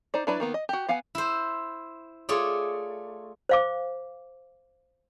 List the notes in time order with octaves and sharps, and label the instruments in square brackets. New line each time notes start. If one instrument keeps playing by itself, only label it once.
[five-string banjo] D#4 C5 D5
F#3 D4 E4 B4 D5
D#3 A#3 B3
D#5
F#4 G4
B3 F5 F#5 G#5
[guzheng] E4 C5
A3 F4 G#4 C#5 D5
[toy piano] C5 F5 D6